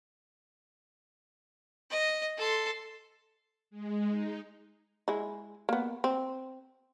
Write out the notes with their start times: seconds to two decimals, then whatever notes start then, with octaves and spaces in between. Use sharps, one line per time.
1.91 D#5
2.38 A4 C6
3.70 G#3
4.08 D#4
5.08 G#3 E4
5.69 A#3 B3
6.04 C4